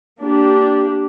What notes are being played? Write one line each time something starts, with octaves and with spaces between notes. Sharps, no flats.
A#3 D4 G4